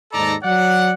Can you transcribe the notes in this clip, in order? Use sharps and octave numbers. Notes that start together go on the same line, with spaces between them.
D#2 G#2 D#4 A4 D5 A#5
F#3 D5 F#5